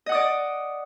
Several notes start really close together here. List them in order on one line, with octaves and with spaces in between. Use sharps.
D#5 F#5 D#6 D5